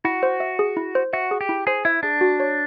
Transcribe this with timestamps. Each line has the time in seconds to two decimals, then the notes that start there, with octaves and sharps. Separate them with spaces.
0.05 E4 F#4
0.23 C5
0.40 E5
0.59 G#4
0.77 E4
0.95 C5
1.13 F#4 E5
1.31 G#4
1.41 G4
1.49 E4
1.67 G#4 C5
1.85 E4 E5
2.03 D4 G#4
2.21 F#4
2.40 C#5